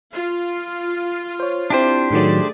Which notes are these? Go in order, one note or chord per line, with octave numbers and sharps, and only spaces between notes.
F4
C5 C#5
C4 D4 E4 G4 C5
A2 D#3 F#3 A3 G#4 D5